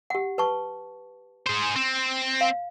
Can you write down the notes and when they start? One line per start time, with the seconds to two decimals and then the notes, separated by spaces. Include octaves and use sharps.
0.10 G4 F#5
0.38 B4 A5 C#6
1.47 G#4 C5
1.76 C4
2.41 F5